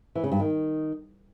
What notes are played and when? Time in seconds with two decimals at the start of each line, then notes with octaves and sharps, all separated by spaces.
0.15 E3
0.24 C#3
0.32 G2
0.40 D#3